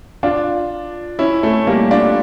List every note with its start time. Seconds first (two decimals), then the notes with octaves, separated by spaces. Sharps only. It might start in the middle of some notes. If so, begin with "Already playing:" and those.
0.23 D4 F4
1.19 C#4 E4
1.43 A3 C#4
1.67 G3 A#3
1.91 D4 F4